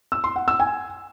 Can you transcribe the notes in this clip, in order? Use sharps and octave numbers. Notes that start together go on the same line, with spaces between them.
E6
C6
F#5
E6
G#5